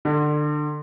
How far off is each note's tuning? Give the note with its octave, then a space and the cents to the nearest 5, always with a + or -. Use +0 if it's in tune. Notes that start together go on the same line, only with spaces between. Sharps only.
D3 +25